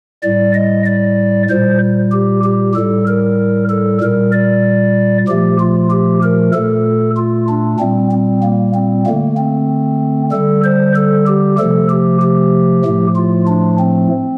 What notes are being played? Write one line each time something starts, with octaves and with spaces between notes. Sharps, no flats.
A2 G3 D5
D#5
D5
A#2 G3 C5
G4
G4
A2 G3 A4
A#4
A4
A#2 G3 A#4
D5
A#2 F3 A3 G4
F4
G4
A#4
A#2 A3 A4
F4
D4
A#2 G3 C4
C4
A#3
C4
D3 A3 A#3
C4
D3 G3 A4
C5
A4
G4
C3 F3 A3 A4
G4
G4
A2 F3 A3
F4
D4
C4